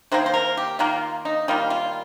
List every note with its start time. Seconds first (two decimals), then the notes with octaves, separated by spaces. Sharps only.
0.12 D#3 A#3 C5
0.26 C5
0.34 A#4
0.57 G4
0.79 D#3 A#3 F4
1.25 D#4
1.48 D#3 G3 A#3 F4
1.70 F4